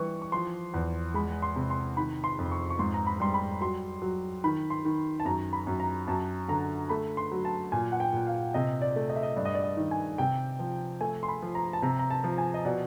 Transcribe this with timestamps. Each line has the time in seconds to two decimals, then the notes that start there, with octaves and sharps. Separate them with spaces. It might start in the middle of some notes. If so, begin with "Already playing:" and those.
Already playing: E3 G3 C#6
0.22 C#6
0.32 F3 C6
0.74 E2
1.14 G#3 B5
1.42 C6
1.56 C3
1.70 C6
1.97 D#3 B5
2.24 C6
2.39 F2
2.52 C#6
2.70 C#6
2.79 G#2 C6
2.94 A#5
3.07 B5
3.20 G3 C6
3.34 B5
3.61 F#3 C6
4.02 F#3
4.44 D#3 B5
4.70 C6
4.85 D#3
5.20 A5
5.25 F#2 A#5
5.53 B5
5.67 F#2
5.80 A#5
6.07 F#2 A5
6.48 D3 A#5
6.89 A3 B5
7.17 C6
7.31 F#3
7.45 A5
7.72 A#2 G#5
7.92 F#5
8.00 G5
8.13 A#2
8.27 F5
8.54 C3 D#5
8.82 D5
8.96 A3
9.09 D#5
9.16 E5
9.23 D#5
9.37 G2 D5
9.45 D#5
9.54 D5
9.64 D#5
9.77 D#3
9.91 G#5
10.18 C3 G5
10.59 F3
11.01 A3 G#5
11.23 C6
11.28 B5
11.42 F3
11.55 A#5
11.73 A5
11.82 C3 A#5
11.99 A#5
12.11 A5
12.24 F3
12.38 G#5
12.54 D#5
12.65 B2 D5